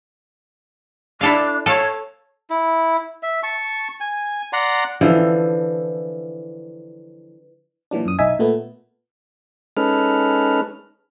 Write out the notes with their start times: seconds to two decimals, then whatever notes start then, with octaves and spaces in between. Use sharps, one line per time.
1.21 D4 E4 A4 F5
1.66 A4 C#5 F5
2.50 E4
3.23 E5
3.43 A5 C#6
4.00 G#5
4.53 D5 F#5 A#5 C6
5.01 D3 E3 F3
7.91 A#2 E3 F#3 D4
8.05 F#2 D#6
8.19 B1 D#4 D#5 E5 G#5
8.39 A#2 A3 B3
9.77 G#3 C#4 D#4 A4 B4 F6